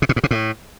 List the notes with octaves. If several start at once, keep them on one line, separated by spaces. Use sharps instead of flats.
C3
A#2
G#2
C3
A2